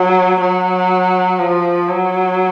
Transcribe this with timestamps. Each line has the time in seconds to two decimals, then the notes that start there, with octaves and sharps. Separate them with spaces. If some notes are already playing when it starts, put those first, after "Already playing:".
Already playing: F#3
0.40 F#3
1.39 F3
1.88 F#3